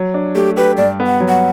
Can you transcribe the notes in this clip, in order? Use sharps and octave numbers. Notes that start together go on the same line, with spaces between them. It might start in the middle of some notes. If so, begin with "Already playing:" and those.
Already playing: F#3
D4
A3 G4
G4 B4
G2 D5
B3
F#5
F#3
F#5